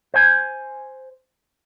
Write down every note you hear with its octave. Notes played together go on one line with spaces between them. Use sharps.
C5 G#5